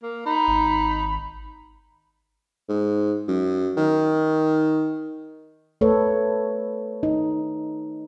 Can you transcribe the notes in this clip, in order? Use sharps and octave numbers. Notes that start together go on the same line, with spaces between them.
A#3
D#4 B5
G#1
G#2
F#2
D#3
A3 A4 B4 C#5
D#4